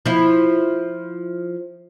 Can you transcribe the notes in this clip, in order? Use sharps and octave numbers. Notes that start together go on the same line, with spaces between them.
F3 E4